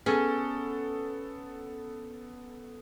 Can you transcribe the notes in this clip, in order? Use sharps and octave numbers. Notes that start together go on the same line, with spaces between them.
B3 C#4 G#4 A4